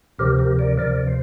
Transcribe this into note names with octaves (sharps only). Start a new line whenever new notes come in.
D2 C3 F3 G4 A#4
G4 A#4
A#4 D5
D2 C3 F3 A#4 D5
C5